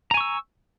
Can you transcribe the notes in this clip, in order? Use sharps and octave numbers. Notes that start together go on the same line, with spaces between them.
G#5 A#5 C#6 E6